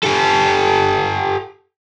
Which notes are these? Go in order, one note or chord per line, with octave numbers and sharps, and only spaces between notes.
G4 A4